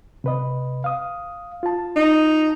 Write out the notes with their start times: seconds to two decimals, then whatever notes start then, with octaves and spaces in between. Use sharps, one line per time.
0.24 C3 B4 D#5
0.84 F5 D#6
1.63 F4 A5
1.96 D#4